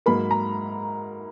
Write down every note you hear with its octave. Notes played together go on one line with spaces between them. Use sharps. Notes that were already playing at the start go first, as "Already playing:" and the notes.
G#2 F#3 A#3 B5
A#5